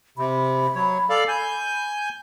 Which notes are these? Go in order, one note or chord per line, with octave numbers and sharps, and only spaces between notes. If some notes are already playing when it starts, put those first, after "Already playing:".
C3 B5
F#3 C#5
A4 D5 F5
G#5 G6